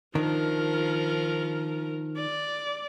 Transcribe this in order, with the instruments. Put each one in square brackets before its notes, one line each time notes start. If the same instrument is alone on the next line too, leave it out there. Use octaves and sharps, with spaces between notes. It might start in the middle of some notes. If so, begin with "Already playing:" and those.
[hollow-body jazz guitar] D#3 D4 [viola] F3 A#4
[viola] D5